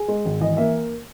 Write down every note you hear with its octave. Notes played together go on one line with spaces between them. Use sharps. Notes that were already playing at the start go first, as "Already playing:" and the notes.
Already playing: G#4
G#3
G#1
E3 D#5
A#3 E5